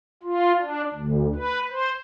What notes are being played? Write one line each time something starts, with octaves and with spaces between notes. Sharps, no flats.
F4
D4
D2
B4
C5